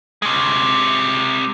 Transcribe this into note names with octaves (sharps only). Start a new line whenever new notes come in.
C3 G#3